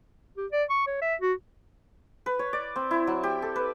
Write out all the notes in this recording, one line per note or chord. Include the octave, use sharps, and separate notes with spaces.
G4
D5
C#6
C#5
E5
F#4
B4
C#5
D5
C4
E4
F#3
G4
A4
B4